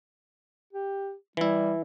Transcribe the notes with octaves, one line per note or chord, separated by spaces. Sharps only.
G4
E3 G3 E4